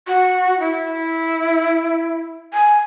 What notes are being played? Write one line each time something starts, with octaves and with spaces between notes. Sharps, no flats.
F#4
E4
G#5